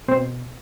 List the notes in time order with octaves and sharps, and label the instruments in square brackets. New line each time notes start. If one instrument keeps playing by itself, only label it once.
[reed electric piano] B2 C4 C5